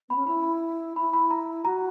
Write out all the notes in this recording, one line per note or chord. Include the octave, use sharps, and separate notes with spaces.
B3 B5
C#4
E4 B5
E4 B5
B5
A#5
F#4 A#5